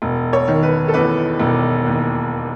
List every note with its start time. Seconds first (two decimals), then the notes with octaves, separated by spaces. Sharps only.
0.02 E1
0.33 C#5
0.48 D#3
0.63 B4
0.88 A4
0.94 E2 B4
1.39 E1
1.86 D#2